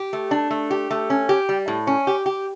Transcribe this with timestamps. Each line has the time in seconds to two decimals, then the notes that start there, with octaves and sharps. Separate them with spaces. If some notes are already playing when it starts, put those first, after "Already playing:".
Already playing: G4
0.13 A3
0.31 D4
0.50 A3
0.71 G4
0.91 A3
1.10 C#4
1.29 G4
1.49 G3
1.68 A2
1.87 C#4
2.07 G4
2.26 G4